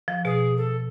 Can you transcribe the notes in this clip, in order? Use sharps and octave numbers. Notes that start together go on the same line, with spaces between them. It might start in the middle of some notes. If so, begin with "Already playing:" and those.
F3
B2 G#4
A4